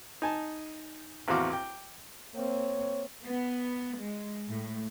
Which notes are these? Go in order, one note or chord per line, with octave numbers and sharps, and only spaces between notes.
D#4 G#5 A5
A1 E2 C4 F#4 F5 D6
G5 D6
A#3 C4 C#5
B3
G#3
A2